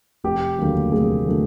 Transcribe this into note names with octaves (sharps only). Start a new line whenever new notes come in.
F1 G4
D#2 D3 F#3 A3
F1 G#4
D3 F#3 A3